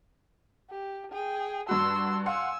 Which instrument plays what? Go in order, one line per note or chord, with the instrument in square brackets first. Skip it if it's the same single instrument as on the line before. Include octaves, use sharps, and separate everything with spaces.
[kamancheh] G4
G#4 G5
[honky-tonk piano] G2 F#4 [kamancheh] C6 E6
[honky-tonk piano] F5 F#5 C6 [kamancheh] G#5 E6